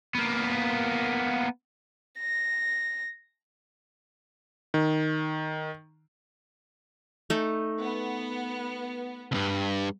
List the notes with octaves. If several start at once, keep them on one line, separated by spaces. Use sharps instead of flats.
A#3 B3
A#6
D#3
A3 D#4
B3
C#2 G2